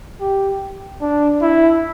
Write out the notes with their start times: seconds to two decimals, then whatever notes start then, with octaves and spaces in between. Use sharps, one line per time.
0.21 G4
1.01 D4
1.42 E4